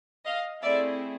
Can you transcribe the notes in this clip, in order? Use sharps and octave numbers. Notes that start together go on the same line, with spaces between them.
D#5 F5
A3 C4 E4 G#4 D5 E5